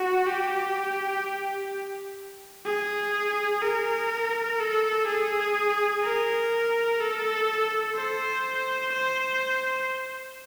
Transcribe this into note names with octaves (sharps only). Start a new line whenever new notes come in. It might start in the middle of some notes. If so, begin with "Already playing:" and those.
Already playing: F#4
G4
G#4
A#4
A4
G#4
A#4
A4
C5
C5